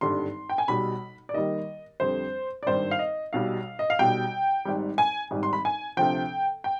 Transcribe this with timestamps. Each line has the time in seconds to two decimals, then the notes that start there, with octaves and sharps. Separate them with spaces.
0.01 G#1 G2 D3 G3 C6
0.50 G5
0.58 G#5
0.68 B1 B2 G3 B5
1.29 D5
1.34 D#2 D#3 G3 D#5
2.00 F2 D3 G3 C5
2.63 D5
2.66 G#1 G2 D#3 G3 C5
2.91 F5
2.99 D#5
3.33 B1 B2 G3 F5
3.79 D#5
3.90 F5
3.99 B1 B2 G3 G5
4.65 G#1 G#2 G3
4.98 G#5
5.31 G#1 G#2 G3
5.43 C6
5.53 B5
5.65 G#5
5.97 D2 C3 F3 G5
6.64 G5